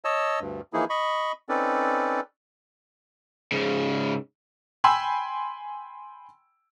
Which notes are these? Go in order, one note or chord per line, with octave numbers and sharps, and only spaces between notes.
C#5 D#5 A5 E6
D2 G2
E3 F3 A#3 D#4 E4 G#4
D#5 B5 C#6
C4 C#4 D#4 A4 B4 D5
G#2 C#3
G5 G#5 B5 C6 E6